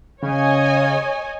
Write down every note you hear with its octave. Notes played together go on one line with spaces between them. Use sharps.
C#3 C#5 D#5 G#5